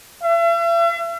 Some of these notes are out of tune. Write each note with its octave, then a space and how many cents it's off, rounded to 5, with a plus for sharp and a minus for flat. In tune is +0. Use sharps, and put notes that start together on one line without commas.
E5 +45